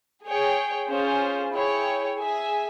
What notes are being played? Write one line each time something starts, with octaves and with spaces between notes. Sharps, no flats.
G#4 C#5 G5
C#4 F4 G#4 C5
E4 G#4 C#5 G5
G#4 E5 G#5